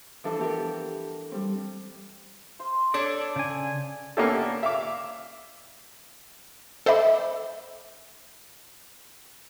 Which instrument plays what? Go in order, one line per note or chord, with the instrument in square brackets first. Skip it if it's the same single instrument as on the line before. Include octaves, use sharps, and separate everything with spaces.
[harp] E3 F3 D4 A4 E5
B3 G4 A4 A#4
G3 C4
[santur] C5 F5 C6
[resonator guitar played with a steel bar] D4 A4 C#5 [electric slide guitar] D5
[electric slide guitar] C#3 G#5
[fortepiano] A#3 B3 C#4 D4 G4 A4
E5 F5 D6
[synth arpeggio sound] A4 C5 D#5 E5 B5 D6